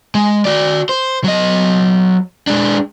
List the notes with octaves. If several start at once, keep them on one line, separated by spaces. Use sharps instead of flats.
G#3
F#4 D5
C5
F#3 D#5
G#3 D4